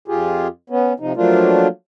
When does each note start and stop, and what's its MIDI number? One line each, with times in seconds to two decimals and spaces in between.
0.08 0.48 41
0.08 0.48 65
0.08 0.48 67
0.08 0.48 68
0.70 0.93 59
0.70 0.93 61
1.00 1.13 48
1.00 1.13 53
1.00 1.13 63
1.16 1.68 53
1.16 1.68 54
1.16 1.68 57
1.16 1.68 58
1.16 1.68 62
1.16 1.68 65